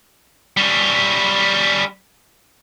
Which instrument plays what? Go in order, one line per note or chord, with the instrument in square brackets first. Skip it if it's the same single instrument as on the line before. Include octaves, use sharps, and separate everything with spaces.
[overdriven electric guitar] G3 C#4